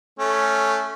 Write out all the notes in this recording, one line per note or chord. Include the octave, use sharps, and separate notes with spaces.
A3 C#4